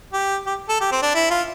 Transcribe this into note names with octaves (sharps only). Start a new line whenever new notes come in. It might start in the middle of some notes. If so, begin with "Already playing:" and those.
G4
G4
A4
G4
C4
D4
E4
F4